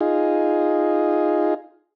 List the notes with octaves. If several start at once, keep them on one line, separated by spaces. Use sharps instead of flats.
D#4 F4 G#4